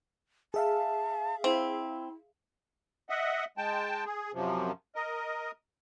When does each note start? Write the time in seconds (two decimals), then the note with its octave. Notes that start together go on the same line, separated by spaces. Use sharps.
0.54 G#4 E5 F5 A5
1.44 C4 E4
3.09 D#5 E5 F#5
3.58 G#3 G5 A5
4.05 G#4
4.34 F#2 C3 F3
4.95 A#4 D#5